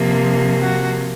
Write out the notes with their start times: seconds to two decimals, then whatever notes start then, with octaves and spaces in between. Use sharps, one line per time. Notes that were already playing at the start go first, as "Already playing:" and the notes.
Already playing: C3 F3 A#3
0.60 F#4